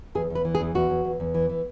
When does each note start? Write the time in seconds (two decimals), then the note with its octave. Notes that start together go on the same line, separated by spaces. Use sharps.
0.15 E2 G#4
0.30 E2
0.35 B4
0.45 E3
0.55 G#4
0.60 E2
0.75 E2 F#4
0.90 E2
1.05 E2
1.20 E2
1.34 E3
1.49 E3